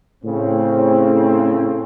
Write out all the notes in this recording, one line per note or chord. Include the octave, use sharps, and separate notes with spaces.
A2 C#3 C4